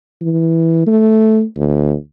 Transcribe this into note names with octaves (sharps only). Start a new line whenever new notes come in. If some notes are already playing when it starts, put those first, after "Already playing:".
E3
A3
D2